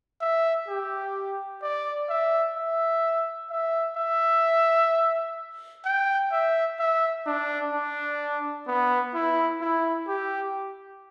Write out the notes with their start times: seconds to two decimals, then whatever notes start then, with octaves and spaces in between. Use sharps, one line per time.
0.21 E5
0.68 G4
1.62 D5
2.09 E5
2.56 E5
3.50 E5
3.97 E5
5.85 G5
6.32 E5
6.79 E5
7.26 D4
7.74 D4
8.67 B3
9.14 E4
9.61 E4
10.08 G4